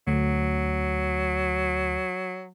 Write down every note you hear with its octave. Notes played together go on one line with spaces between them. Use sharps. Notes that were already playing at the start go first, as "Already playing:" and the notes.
D2 F#3